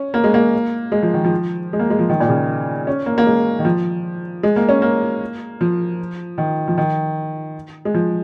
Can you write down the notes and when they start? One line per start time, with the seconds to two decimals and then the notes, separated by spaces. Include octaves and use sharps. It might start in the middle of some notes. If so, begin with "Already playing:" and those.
Already playing: C#4
0.14 A#3
0.24 G#3
0.34 A#3
0.92 G#3
1.03 F3
1.14 D#3
1.24 F3
1.73 G#3
1.79 A#3
1.90 G#3
1.99 F3
2.09 D#3
2.20 A#2
2.29 C#3
2.87 C#4
3.06 A#3
3.18 A#3
3.26 G#3
3.59 D#3
3.65 F3
4.43 G#3
4.56 A#3
4.69 C#4
4.82 A#3
5.61 F3
6.38 D#3
6.68 F3
6.78 D#3
7.85 G#3
7.94 F3